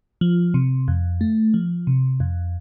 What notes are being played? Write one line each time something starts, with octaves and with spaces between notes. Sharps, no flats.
F3
C3
F2
A3
F3
C3
F2